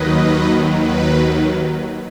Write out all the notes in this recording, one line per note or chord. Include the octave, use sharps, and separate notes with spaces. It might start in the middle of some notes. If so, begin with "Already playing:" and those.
Already playing: D#2 D#3 F#3 B4 D#5
B4